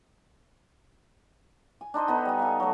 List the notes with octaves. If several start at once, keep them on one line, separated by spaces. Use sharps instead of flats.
G#5
D4 D#4 C5 D#5
B3 D#4 A4
G3 G#5
A4 F5
F#3 A3